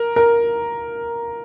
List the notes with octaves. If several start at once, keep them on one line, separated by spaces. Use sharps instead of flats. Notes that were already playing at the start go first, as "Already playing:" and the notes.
Already playing: A#4
A#4